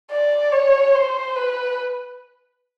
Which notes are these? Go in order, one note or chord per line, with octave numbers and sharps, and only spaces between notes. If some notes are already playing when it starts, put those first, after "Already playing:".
D5
C#5
C5
B4